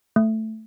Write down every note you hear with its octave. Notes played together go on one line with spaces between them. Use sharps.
A3